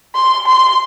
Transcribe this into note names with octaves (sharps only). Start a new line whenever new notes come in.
C6
C6